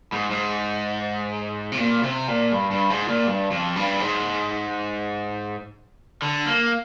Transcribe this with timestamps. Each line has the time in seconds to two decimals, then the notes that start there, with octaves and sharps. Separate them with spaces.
0.12 G#2
0.31 G#2
1.72 C3
1.78 A#2
2.03 C3
2.28 A#2
2.52 G2
2.71 G2
2.90 G#2
3.08 A#2
3.27 G2
3.51 F2
3.76 G2
4.00 G#2
6.22 D3
6.46 A#3